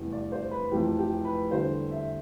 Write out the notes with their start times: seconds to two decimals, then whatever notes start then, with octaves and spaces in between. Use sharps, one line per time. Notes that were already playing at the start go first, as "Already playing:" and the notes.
Already playing: F1 E2 C3 G3 B3
0.12 D5
0.32 C5
0.51 B4
0.71 F1 F2 E3 G4
0.99 G4
1.25 B4
1.51 E2 D3 G3 C5
1.91 E5